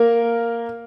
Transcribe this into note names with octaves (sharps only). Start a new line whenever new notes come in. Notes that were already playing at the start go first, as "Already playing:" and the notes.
Already playing: A#3 A#4